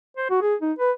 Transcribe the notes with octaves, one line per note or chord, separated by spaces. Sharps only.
C5
F#4
G#4
D#4
B4